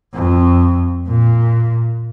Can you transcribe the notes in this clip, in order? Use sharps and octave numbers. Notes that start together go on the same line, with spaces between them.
F2
A#2